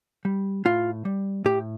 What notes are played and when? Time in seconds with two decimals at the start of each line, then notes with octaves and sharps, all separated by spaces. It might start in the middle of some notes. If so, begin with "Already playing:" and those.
0.25 G3
0.65 A2 F4
1.05 G3
1.45 A2 G4